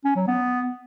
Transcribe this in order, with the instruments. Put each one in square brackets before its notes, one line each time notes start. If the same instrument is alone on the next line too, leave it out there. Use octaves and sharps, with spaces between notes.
[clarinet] C#4
F#3
B3